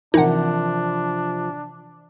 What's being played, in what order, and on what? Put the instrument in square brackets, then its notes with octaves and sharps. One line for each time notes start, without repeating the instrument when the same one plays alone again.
[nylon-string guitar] C3 F3 [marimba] E3 A#4 [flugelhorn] D4 [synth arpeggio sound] D#4 F#5